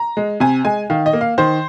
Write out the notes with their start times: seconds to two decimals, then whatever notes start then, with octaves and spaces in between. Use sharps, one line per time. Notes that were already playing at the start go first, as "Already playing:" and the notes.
Already playing: A#5
0.17 G#3
0.40 C3 G#5
0.65 G#3 G#5
0.90 D#3 F5
1.06 D#5
1.13 A#3
1.21 F5
1.38 D#3 C5